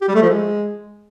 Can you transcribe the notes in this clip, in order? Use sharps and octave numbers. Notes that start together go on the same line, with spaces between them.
G4
G3
A3
F3
G#3